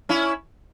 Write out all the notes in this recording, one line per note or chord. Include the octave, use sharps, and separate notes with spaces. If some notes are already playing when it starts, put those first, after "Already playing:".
C#4 E4